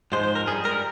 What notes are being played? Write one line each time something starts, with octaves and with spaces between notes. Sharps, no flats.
G#2 F3 G#3 C5
C5
A#4
G2 G3 G#4
A#4